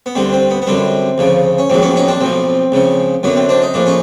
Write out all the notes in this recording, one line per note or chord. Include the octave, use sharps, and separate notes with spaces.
B3
D2 D3 G3 C4
C4
B3
B3
F#2 D3 G3 C4
D2 C#3 F3
C#4
A#1 G#2 D#3 F#3 C4
B3 C#4
C#4 D#4
C4 D4
B1 A2 F3 C4
C#2 C#3 F3
F#2 D3 F#3 B3
C4
C4 D4
D#4
A#1 A2 F3 D4
C#4 D#4